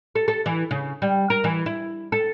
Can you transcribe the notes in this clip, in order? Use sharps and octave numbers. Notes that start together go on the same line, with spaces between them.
A4
A4
E3
C#3
G3
A#4
E3
E4
A4